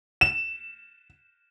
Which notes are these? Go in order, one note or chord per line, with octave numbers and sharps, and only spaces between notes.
E7